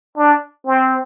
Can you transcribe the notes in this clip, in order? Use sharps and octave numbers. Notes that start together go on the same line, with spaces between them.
D4
C4